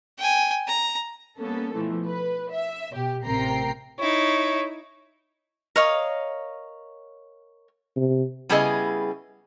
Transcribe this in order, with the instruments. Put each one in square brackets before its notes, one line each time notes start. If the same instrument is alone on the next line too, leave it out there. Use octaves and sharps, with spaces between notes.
[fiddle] G5 G#5
A#5
[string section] G3 A#3 B3 C#4 A4
B2 E3 F3 A3
B4
E5
B2 G4
A1 C3 A#4 G5 A#5 C7
[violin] D#4 E4 [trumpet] C#5
[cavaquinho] A#4 C#5 D#5 F5
[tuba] C3
[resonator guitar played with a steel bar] C#3 G3 B3 E4 G#4 D#5